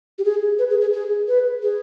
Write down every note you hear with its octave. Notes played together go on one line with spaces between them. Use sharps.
G4
G#4
B4
G#4
G#4
G#4
B4
G#4